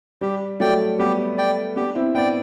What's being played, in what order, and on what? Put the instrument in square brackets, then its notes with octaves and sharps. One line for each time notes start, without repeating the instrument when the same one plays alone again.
[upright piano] G3 [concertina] G4
[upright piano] F#3 A3 [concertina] D5 G5
[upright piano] G3 B3 [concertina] G4
[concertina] D5 G5
[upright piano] B3 D4 [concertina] G4
[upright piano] C4 E4
[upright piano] B3 D4 [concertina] D5 G5